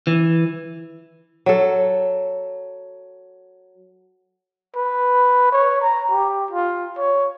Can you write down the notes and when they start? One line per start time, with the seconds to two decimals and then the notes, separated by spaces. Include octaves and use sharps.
0.07 E3
1.46 F#3 A4
4.76 B4
5.52 C#5
5.81 A#5
6.11 G4
6.51 F4
6.98 C#5